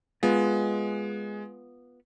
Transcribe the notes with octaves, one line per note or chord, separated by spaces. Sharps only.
G#3 B3 F4